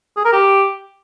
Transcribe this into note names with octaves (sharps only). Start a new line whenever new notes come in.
G#4
A#4
G4